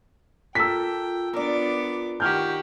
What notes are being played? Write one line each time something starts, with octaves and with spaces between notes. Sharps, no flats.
A#3 F4 A4 G5 E6 B6
B3 D4 A#4 D5 D6
D#3 F#4 G4 F6 G6